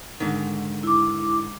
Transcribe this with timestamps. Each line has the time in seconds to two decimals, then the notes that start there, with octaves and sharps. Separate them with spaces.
0.20 G#2 D3 D#3
0.83 E4 D6